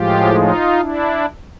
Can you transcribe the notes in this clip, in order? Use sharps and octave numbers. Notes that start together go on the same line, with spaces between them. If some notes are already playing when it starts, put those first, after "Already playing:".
Already playing: A2 F3 G#3 F4 G4
D#4 F4
D4 E4